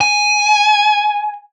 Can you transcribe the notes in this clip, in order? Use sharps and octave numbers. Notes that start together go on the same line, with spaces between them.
G#5